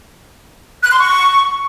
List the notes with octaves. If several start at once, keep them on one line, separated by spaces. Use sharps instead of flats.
F#6
C6
C#6